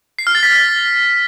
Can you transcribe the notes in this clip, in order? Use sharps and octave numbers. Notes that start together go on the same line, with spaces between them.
C7
F6
A6
B6
A6